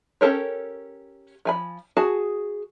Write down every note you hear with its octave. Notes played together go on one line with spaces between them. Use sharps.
C#4 G4 A4 A#4 C#5
F3 G#5 B5
F#4 G#4 A5